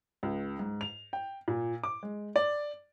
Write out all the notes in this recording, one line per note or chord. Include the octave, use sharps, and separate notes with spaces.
C#2
G#2
F7
G5
A#2
D6
G#3
D5